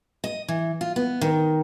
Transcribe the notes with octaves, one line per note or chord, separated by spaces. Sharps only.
D#5
E3
F4
B3
D#3